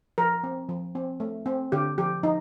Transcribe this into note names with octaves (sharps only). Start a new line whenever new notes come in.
F3 A#4
C4
F3
C4
A3
C4
D3 G4
F3 G4
F3 D#4